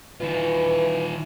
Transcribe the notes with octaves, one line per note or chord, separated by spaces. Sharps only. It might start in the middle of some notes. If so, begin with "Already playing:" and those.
D#3 E3 F4